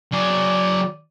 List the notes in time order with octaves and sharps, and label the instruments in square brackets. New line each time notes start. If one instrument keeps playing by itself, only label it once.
[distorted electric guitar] F#3 G#4 [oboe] D5